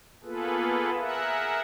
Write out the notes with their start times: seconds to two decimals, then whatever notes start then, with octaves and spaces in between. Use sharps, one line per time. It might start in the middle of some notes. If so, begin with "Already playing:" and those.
0.24 A#3 B3 F4 G#4 A4 B4
0.99 G#4 A#4 E5 F#5